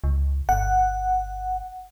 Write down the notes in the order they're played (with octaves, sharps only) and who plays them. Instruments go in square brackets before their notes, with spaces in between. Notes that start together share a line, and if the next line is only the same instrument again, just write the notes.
[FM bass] C#2
[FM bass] G1 [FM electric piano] F#5